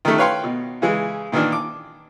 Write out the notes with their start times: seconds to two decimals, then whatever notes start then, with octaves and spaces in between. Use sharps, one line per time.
0.05 D#3 G3 A3
0.18 B4 C#5 F5 G5 C6
0.44 B2
0.82 C#3 E3 G#3
1.32 A#2 D#3 E3 A#3 D4
1.52 D6